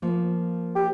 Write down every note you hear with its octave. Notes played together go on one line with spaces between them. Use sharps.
F3 A#3
G4